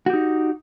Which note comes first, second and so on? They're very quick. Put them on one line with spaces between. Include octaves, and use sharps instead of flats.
F#4 G4 D#4